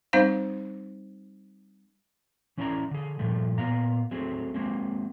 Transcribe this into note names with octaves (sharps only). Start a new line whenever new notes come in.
G3 C4 D#4 C5 F5
E3 C#4 E4 C#5 D5 A#5
D3 G#4
G2 A#2 F3 A3
A#2 B3 F5 A#5
F#3 A3 C4 G#4
F#3 G#3 A#3 C4